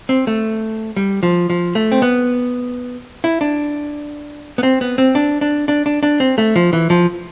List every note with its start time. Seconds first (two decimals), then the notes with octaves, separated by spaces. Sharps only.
0.09 C4
0.27 A3
0.97 G3
1.23 F3
1.50 F3
1.75 A3
1.92 C4
2.02 B3
3.24 E4
3.41 D4
4.58 B3
4.63 C4
4.81 B3
4.98 C4
5.15 D4
5.41 D4
5.68 D4
5.86 D4
6.03 D4
6.20 C4
6.38 A3
6.56 F3
6.73 E3
6.90 F3